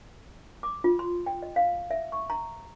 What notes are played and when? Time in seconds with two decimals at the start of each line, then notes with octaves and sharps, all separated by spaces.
0.63 D6
0.84 F4
0.99 C6
1.26 G5
1.42 D#5
1.56 F5
1.91 E5
2.12 C#6
2.30 A#5